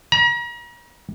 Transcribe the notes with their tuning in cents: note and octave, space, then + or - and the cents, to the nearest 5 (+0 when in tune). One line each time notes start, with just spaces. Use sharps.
A#5 +40